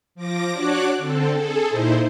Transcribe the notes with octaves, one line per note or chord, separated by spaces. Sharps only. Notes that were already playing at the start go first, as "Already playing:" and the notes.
F3 D6 A#6
D4 F#4 C#5 D6 F#6
D3 C4 A4
G#4 A4
A#2 D#4 E4 C5